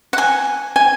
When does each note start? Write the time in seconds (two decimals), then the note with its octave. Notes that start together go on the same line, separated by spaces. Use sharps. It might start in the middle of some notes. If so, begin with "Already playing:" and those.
0.13 F#5
0.18 G#5
0.76 G#5